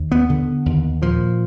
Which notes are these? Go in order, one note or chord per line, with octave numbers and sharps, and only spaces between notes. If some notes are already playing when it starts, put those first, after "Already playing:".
Already playing: D#2
B3
D3
D#2
A#2 F3